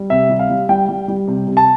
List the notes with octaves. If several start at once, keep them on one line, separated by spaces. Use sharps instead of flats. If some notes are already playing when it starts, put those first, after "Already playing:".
Already playing: G3
C3 E5
G3
F5
G3
G3 G5
G3
G3
C3
C3
A5